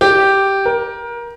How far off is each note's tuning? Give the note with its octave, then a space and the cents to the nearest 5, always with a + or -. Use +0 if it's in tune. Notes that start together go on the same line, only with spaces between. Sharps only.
G4 -5
A#4 +25